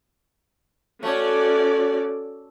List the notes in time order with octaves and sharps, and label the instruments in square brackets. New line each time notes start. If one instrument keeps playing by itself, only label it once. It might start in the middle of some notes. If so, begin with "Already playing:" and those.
[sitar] A3 [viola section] C#4 F#4 D5